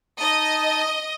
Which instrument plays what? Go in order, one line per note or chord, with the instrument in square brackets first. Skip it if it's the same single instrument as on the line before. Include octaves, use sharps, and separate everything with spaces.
[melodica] D#4 A5 [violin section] D#5